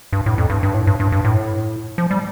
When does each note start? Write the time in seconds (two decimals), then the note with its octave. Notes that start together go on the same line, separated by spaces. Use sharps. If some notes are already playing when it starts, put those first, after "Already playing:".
0.13 G2
0.26 A2
0.38 F2
0.50 G2
0.63 G2
0.74 A2
0.87 G2
1.00 G2
1.12 G2
1.24 A2
1.98 F3
2.11 G3